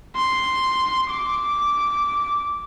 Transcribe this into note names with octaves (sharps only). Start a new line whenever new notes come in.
C6
D6